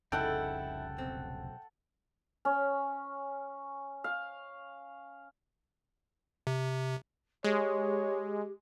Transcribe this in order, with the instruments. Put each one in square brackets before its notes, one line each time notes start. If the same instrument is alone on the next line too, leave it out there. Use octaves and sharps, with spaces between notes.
[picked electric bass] F1 C2 C#3 [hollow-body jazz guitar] D#4 E4 [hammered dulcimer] A4 F#5 [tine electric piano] G5
[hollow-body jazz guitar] B1 C4
[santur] C#4
F5
[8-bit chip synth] C3
[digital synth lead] G#3 [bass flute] G4 [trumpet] C#5